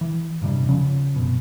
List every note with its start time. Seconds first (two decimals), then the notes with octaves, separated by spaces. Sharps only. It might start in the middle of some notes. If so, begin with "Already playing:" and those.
0.01 E3
0.42 E1 G2 C3 G3
0.69 C#3 F3 C#4
1.16 F#1 B2